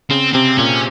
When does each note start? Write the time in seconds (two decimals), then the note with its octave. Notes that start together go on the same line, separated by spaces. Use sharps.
0.11 C#3 C4
0.34 C3 C4
0.59 A#2 C#4